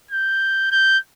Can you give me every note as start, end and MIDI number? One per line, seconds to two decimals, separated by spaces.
0.11 0.68 91
0.71 0.98 91